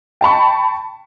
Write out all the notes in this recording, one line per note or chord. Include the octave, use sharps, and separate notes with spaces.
G5 A5 B5 C#6